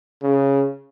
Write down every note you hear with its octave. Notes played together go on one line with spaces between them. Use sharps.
C#3